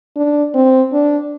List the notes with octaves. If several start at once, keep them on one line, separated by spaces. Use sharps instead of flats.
D4
C4
D4